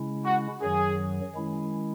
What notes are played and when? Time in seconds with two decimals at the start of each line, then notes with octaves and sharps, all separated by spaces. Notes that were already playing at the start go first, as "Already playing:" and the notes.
Already playing: C#3 G#3 C#4 E4
0.25 F#4
0.62 F#2 D#3 F#3 G#4
1.35 D#3 G#3 C#4 E4